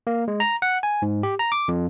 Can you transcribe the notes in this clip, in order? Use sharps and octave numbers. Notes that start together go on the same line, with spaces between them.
A#3
G#3
A#5
F#5
G#5
G#2
G4
A#5
D6
F2